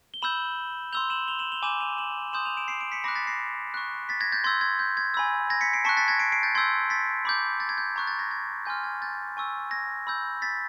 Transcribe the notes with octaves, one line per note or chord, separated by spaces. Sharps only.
G7
B5 E6 G6 E7 F#7
C6 E6 G6 F7 G7
E7 F#7
F7 G7
E7 F#7
F7 G7
G#5 B5 D6 G6 E7 F#7
D#7 F7
E7 F#7
C6 D#6 G6 E7 F#7
D#7 F7
D7 E7
C7 D7
C7 D7
B6 C#7
B5 D6 F#6 A#6 C7
A6 B6
A#6 C7
C#6 F#6
A6 B6
G#6 A#6
G6 A6
C6 E6 G6 G#6
G#6
G6
G#6
G#5 B5 E6
G#6 A#6
B6 C#7
C7 D7
A5 C#6 F#6 B6 C#7
A6 B6
G#6 A#6
C7 D7
C7 D7
G6 A6
C6 E6 G6 G#6
A6 B6
B5 D6 G6
G6 A6
G#6
G6
A#5 C#6 F#6 G#6
G6 A6
G#6 A#6
G#6
G#5 C6 F6 G6
G#6
G6 A6
G#5 C#6 E6
G#6 A#6
B5 E6 G6
A6 B6